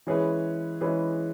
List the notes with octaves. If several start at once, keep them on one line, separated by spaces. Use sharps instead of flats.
E3 G#3 C#4 G#4 B4
E3 G#3 C#4 G#4 B4